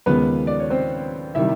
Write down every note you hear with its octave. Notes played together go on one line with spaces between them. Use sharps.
D#2 C#3 F3 G#3 B3 B4
D5
C#5
C4 C5
C3 D#3 G3 E4 E5